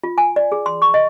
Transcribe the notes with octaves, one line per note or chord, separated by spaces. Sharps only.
F4
G#5
D5
G#4
C6
C#6
D#5